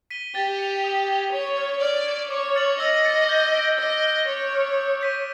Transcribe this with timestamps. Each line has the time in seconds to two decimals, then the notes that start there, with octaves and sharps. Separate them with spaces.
0.10 B6 D#7 G7
0.35 G4 A6
0.59 C#7 F7
0.84 D#6
1.08 G#6 C7 E7 G7
1.33 C#5 C#6
1.57 F6 G#6
1.82 D5 F6
2.07 G#6 C#7 E7
2.30 C#5 D6
2.56 F6 A6 C#7 F#7
2.79 D#5 E6
3.05 A6 C#7
3.29 G6
3.54 B6 D7 G7
3.78 D#5 D6
4.03 F#6 A#6
4.27 C#5 D6
4.52 F6 A#6
4.77 D#6
5.01 G6 B6 D#7